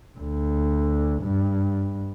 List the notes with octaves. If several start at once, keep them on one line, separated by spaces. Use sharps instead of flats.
D2
G2